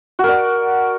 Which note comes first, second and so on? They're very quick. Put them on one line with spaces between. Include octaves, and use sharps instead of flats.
F#4 A#4 D5